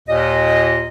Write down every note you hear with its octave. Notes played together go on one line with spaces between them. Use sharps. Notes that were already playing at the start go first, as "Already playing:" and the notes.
D#2 A#2 D#5